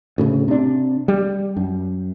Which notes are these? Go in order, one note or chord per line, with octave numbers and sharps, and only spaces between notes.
D2 A2 C#3
C3 D4
G3
F#2